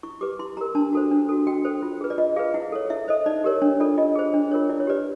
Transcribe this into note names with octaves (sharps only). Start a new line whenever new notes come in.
E4 C#6
G4 B4 D6
E4 C6
G4 A#4 A#5
D4 A5
F#4 A4 C5
D4
F#4 A4
F#4 G5
A4 C5
F4
G#4 B4
D5
F4 D#5
G#4 B4 F5
E4 F#5
A4 C#5
E4 E5
A4 C5 D#5
D#4 D5
G4 A#4 C#5
D4 C#5
F4 A4 D5
F4 D#5
G#4 C5
D4
F4 A#4 C#5
E4 D5
C#5
G4 B4 D5